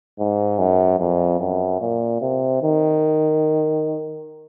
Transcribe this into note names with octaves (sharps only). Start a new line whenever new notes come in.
G#2
F#2
F2
F#2
A#2
C3
D#3